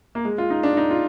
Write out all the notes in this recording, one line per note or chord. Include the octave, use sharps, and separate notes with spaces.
A#3
G#3
F4
D#4
D4
D#4
F4